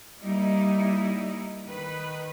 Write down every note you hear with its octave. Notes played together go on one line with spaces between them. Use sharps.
G3 A#3 D#4 E4
D#3 B4